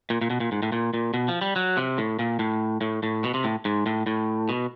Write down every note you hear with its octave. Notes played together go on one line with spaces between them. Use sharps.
A#2
A#2
B2
A#2
G#2
A2
A#2
A#2
B2
F3
G3
F#3
C3
A2
A#2
A2
A2
A2
B2
C3
A2
G#2
A2
A2
B2